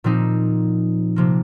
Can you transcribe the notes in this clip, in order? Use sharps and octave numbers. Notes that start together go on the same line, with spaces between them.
A#2 F3 C4 D#4
C3 F3 A#3